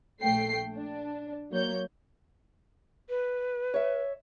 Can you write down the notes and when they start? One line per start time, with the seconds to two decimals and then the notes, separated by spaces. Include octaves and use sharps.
0.22 A#1 A3 G5 C7
0.76 D4
1.51 F#3 A#3 C#5 G6
3.09 B4
3.74 C#5 E5